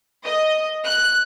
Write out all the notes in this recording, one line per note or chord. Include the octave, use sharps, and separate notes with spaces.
D#5
F#6